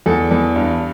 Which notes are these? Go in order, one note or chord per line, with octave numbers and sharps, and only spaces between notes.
E2 A4
E2
G2